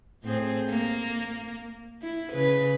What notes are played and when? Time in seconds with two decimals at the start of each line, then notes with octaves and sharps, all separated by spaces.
0.24 A2 C4 G#4
0.70 A#3
2.02 E4
2.32 C#3 B4